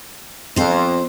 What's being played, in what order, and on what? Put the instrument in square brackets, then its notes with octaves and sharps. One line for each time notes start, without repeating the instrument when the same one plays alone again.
[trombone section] F2 [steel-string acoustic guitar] C4 C5